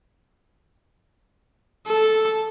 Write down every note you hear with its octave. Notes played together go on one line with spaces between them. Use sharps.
A4